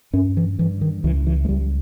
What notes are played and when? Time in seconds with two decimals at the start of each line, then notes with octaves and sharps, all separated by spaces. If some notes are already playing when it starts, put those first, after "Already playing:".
0.13 G2 C#4
0.37 E3
0.59 G2 E3
0.81 D#3
1.04 C#2 E3
1.26 E3
1.45 G#3
1.49 C#2 G3